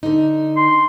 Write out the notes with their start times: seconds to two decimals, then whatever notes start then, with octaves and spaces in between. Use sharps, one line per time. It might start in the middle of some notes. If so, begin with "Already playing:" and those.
0.03 D3 D#4
0.57 C6